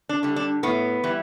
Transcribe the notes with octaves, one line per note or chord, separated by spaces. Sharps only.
D4
D3 G3
D4
A2 B3
E3 G3